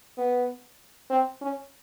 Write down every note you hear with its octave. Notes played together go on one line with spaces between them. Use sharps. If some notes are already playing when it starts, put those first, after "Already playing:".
B3
C4
C#4